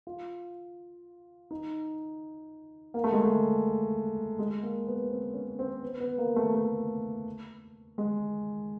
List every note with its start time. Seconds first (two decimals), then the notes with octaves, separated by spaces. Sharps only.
0.07 F4
1.51 D#4
2.94 A#3
3.04 A3
3.13 G#3
3.22 A3
4.39 G#3
4.63 A#3
4.87 B3
5.11 C4
5.34 C#4
5.59 C4
5.83 B3
6.00 B3
6.18 A#3
6.36 A3
6.55 A3
7.98 G#3